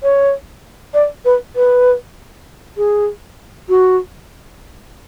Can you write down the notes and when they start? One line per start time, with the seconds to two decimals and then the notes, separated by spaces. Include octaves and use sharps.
0.03 C#5
0.94 D5
1.25 B4
1.56 B4
2.77 G#4
3.69 F#4